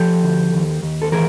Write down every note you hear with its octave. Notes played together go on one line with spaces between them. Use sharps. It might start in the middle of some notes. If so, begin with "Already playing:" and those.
Already playing: F3 G4 A4
D2
D#2
D#2
A4
E3 G#4 A#4